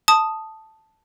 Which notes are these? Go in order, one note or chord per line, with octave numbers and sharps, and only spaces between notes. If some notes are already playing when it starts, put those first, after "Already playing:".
A5 D#6